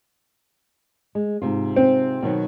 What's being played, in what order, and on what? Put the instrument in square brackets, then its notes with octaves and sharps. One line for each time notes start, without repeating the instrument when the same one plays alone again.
[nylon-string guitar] G#3
G#2 C3 F4
[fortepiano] C4
[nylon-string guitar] B2 D#3 F#3